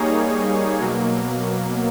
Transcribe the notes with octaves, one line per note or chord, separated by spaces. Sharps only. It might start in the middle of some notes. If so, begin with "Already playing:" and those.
Already playing: G3 A#3 D#4 G#4 C#5
B2 F#3 A#3